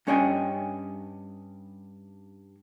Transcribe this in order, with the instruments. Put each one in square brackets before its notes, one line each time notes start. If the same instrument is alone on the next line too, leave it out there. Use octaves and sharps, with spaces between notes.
[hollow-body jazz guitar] G2 C#4 C#5 D#5 G5 G#5